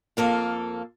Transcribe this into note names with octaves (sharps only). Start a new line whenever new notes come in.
F2 A#3 A4 F5